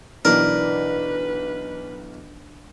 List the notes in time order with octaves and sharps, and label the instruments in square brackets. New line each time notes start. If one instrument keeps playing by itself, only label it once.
[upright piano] B1 E3 [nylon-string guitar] D4 [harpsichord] A#4 [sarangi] B4